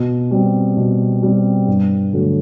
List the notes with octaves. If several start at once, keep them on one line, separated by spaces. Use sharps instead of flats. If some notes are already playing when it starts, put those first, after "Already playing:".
Already playing: B2
G3 C4
B2
G3 C4
G2
D3 F#3 A3